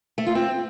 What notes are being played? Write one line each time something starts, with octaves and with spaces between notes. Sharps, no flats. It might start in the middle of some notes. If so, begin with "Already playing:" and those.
A3
F4
C4